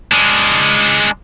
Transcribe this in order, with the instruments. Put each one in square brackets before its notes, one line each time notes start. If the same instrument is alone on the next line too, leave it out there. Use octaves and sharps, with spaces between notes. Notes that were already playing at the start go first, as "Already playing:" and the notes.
[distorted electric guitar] G#3 D4